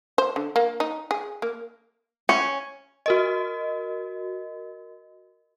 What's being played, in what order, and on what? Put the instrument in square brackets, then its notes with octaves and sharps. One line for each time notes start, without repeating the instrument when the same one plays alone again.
[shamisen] C5
D3
A#3
D#4
G#4
A#3
[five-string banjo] C#4
[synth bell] F#4 A#4 D#5